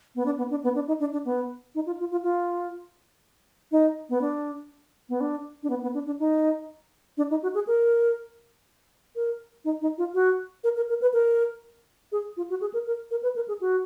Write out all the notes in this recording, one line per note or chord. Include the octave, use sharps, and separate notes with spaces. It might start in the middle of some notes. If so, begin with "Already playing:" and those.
B3
D4
B3
D4
B3
D4
D#4
D4
D4
B3
D#4
F4
F4
F4
F4
D#4
B3
D4
B3
D4
D4
B3
B3
D4
D4
D#4
D4
D#4
F#4
G#4
A#4
A#4
D#4
D#4
F4
F#4
A#4
A#4
A#4
B4
A#4
G#4
F4
F#4
G#4
A#4
A#4
A#4
B4
A#4
G#4
F#4